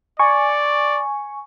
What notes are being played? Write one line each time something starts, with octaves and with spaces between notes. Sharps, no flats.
D5 G#5 C#6